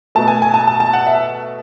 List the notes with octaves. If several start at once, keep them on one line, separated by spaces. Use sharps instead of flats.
B2 A3 A5
G#5
G#5
A5
A5
A5
F#5
E5